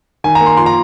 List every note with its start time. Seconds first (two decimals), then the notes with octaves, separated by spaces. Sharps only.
0.24 D#3 G#5
0.35 A#5
0.40 A#3
0.46 C6
0.57 F3 C6
0.66 A#5